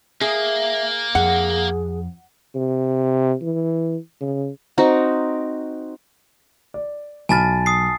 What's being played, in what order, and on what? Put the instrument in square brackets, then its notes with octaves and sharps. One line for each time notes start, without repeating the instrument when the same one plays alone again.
[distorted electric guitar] A#3 [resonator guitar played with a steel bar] G#4 [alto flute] E5
[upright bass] F2 [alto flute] G#4 [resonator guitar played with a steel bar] F#5
[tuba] C3
E3
C#3
[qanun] C4 D#4 F#4
[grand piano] D5
[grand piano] B1 B5 F6 [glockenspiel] G#5 A5 A6
[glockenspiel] D#6 C7